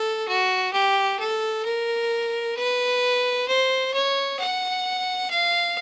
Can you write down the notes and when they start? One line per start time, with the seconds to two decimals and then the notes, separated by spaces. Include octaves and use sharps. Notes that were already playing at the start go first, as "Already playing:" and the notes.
Already playing: A4
0.28 F#4
0.73 G4
1.19 A4
1.65 A#4
2.57 B4
3.48 C5
3.94 C#5
4.39 F#5
5.30 F5